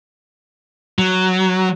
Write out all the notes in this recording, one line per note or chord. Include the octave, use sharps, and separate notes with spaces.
F#3